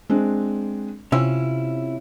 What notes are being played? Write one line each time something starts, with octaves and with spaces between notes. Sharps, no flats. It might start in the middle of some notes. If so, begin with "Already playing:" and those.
G#3 C4 D4
C3 C#4 E4 F4 E6